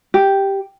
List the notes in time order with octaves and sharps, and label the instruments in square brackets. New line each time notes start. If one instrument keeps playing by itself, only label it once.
[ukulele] G4